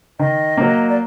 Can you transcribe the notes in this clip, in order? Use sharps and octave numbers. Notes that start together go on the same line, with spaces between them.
D#3 D#5
F#3 A#3
D5